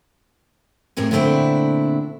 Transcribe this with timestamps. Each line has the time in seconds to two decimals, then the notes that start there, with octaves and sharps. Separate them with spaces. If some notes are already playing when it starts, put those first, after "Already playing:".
0.97 A2 C3 G#3 A#4 G#5
1.11 A#2 D3 A3 C4 D4 E4